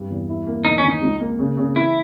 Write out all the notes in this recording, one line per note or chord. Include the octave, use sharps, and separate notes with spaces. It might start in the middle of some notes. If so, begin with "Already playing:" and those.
Already playing: G2 G3
E2
E4
A#3
E2 D#4
C#4
D#3
D#4
C#2
A#3
C#3
C#3
E3 E4